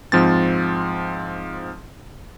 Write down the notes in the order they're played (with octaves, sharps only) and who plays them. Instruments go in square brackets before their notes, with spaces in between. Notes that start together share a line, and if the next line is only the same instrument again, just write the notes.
[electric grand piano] G#2 F3 C4 A6